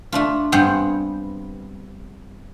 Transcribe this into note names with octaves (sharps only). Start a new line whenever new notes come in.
A3 D4 F4
G2 B3 C4 G#4 F#5 G5